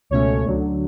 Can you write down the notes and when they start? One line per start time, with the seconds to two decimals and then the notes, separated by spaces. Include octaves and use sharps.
0.10 C#2 B2 A3 C#4 C#5
0.44 D2 D3 F#3